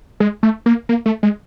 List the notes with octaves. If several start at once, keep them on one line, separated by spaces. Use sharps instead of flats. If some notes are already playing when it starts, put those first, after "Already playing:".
G#3
A3
A#3
A#3
A3
G#3